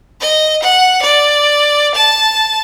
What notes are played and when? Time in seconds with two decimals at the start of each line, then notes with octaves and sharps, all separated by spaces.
0.21 D#5
0.63 F#5
1.03 D5
1.95 A5